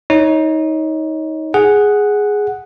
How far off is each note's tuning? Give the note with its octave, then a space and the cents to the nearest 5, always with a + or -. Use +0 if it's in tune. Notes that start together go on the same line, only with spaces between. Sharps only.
D#4 +25 C#5 +5
G#4 +0 F#5 +0